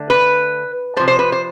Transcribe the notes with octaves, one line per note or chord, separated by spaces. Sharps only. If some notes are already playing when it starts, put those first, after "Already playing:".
Already playing: D3 A3
B4
A3 C5
C3 F3
C5
B4
C5